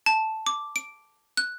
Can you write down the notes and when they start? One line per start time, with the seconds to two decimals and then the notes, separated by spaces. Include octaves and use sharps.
0.06 A5
0.47 D6
0.76 D7
1.37 F#6